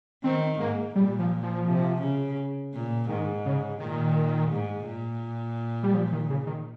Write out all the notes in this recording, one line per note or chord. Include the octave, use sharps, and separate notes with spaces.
D#3 C4
G#2 A#3
A#2 G3
F3
F3
C3
C#3
A#2
G#2 D#3
C#3
A#2 D#3
G#2
A#2
G3
F3
D#3
C#3
D#3